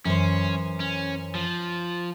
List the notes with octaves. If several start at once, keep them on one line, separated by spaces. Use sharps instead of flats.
F#2 E3 C#4 C5
C#4
F3